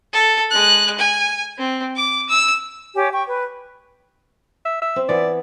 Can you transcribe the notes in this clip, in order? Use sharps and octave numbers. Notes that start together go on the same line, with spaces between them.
A4
G#3 F#6
G#5
C4
D6
E6
G4 C#5 G#5
G5 C#6
B4
E5
E5
C4
E3 B3 D5